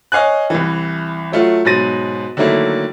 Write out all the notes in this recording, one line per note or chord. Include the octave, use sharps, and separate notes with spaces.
C#5 D#5 F5 G#5 F#6
C2 E3
F#3 A3 F4 F#4
G#2 B2 F#3 A6 A#6 D#7
D3 D#3 F#3 A3 A#3 E4